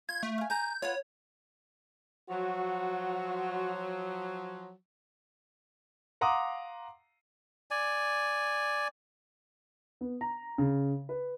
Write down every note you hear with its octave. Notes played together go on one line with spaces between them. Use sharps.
F4 G#6
A3
F5 G#5
G#5 A#5 G6
F4 B4 C#5 F#5
F3 F#3 F#4
F5 F#5 A#5 C6 D6 D#6
D5 G#5
B3
A#5
C#3
B4